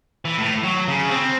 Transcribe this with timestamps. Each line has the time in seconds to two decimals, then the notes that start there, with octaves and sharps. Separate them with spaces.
0.25 E3
0.38 A2
0.63 F#3
0.88 C#3
1.10 C4